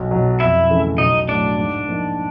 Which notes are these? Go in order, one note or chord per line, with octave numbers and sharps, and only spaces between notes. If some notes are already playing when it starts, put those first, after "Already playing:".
Already playing: B1
B2 F#3
F2 E4 E5
C#3 E3 A3
B1 D#4 D#5
A2 F#3 D4 D5
G#2
F3 A#3 D#4